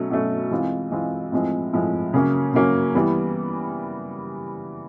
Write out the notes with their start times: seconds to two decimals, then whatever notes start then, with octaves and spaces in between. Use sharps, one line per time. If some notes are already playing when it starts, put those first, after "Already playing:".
Already playing: B2 F#3 A3 C#4
0.10 B2 F#3 A3 C#4
0.51 E3 G#3 C4 F4
0.91 E3 G#3 C4 F4
1.32 A2 F3 G#3 C4
1.73 A2 F3 G#3 C4
2.13 C#3 F#3 A#3 C#4
2.54 C#3 F#3 A#3 C#4
2.95 E3 G3 B3